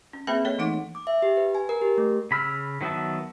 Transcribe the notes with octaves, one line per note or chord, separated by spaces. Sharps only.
C#4
A#3 C4 G#4 B4 E5 B5
A#3 A4 C#5 D#5
E3 A3 D#4 F#5 D6
D6
E5
G4
B4
G#5
A#4
G4
A3
C#3 B5 E6 F6
D#3 F#3 B3 E5 A5